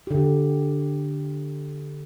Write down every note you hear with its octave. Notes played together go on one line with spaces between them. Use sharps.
D3 G4